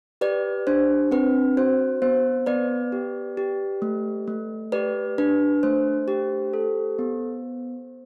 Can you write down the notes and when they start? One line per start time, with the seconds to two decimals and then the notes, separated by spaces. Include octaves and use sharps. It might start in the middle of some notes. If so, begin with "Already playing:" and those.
0.21 G4 B4 D5
0.67 D4 C5
1.11 C4 B4
1.57 F#4 C5
2.02 B3 C5
2.46 B3 B4 D5
2.92 G4
3.37 G4
3.82 A3
4.28 A3
4.72 G4 B4 D5
5.18 D4 B4
5.63 A3 C5
6.08 G4
6.53 A4
6.99 B3